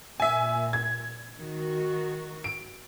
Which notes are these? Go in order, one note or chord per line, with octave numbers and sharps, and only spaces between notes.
A#2 E5 G#5
G#6
D#3 F#4
D7